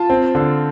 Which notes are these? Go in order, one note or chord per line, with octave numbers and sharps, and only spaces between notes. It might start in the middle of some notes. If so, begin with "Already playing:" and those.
Already playing: F4 A5
C4
D3